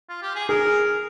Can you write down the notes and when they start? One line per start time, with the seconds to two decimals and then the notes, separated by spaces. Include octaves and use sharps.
0.08 F4
0.22 G4
0.35 G#4
0.49 G#4 A#4